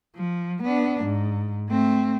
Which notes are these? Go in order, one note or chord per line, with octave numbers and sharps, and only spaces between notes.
F3
B3 D4
G#2
A3 C4